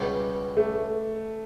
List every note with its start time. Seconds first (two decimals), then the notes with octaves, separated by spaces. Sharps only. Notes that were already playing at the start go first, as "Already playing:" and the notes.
Already playing: C#2 B2 G3
0.57 A3